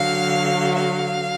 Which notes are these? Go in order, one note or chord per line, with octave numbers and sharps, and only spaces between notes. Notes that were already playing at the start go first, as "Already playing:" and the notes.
Already playing: D3 F#3 F5
F5